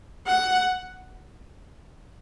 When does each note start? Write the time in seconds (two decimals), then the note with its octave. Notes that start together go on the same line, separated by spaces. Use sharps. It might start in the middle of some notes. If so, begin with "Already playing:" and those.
0.27 F#5